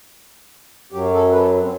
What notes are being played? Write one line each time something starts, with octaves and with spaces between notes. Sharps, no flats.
F#2 F#3 G4
A4
B4
A4
C4